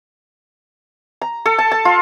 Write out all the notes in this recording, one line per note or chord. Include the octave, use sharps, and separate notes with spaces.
A#5
A4
A5
A5
F4